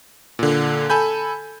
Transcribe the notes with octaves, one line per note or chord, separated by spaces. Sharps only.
A#2 D3
A4 G#5 B5 G6